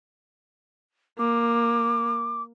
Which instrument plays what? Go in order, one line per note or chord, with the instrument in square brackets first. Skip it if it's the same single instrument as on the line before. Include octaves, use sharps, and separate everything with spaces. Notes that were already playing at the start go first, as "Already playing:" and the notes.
[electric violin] A#3 [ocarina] D6